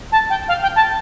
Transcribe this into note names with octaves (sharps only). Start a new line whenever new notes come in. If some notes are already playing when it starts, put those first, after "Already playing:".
A5
G5
F5
G5
A5